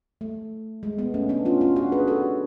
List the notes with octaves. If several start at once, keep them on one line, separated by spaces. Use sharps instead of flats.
A3
G#3
G#3 B3
A3 C#4
B3 D4
C#4 F4
C#4 F4
D4 F#4
G#4 B4
F#4 A4